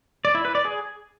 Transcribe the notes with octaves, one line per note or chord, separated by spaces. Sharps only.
D5
E4
B4
D5
G#4